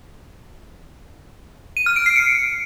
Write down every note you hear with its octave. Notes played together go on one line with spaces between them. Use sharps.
D#7
F6
D7
C7
C#7